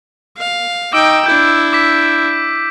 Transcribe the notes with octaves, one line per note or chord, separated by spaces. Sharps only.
F5
D#4 G5 D6 E6 D7
D4 E4 G6
D6 B6